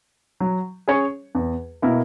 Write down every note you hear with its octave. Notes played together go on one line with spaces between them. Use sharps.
F#3
C#4 G#4 C#5
E2
B2 A#3 E4 A#4